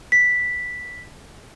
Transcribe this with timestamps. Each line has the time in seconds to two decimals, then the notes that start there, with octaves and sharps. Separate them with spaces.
0.12 B6